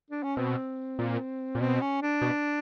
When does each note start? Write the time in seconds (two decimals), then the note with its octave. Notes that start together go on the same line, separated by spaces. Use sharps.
0.11 D4
0.23 C#4
0.37 B2 C4
0.99 A#2
1.55 A#2
1.60 B2 C4
1.81 C#4
2.02 D4
2.22 B2